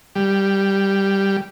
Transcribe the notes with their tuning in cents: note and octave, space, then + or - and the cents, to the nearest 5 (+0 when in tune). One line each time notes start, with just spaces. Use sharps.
G3 +0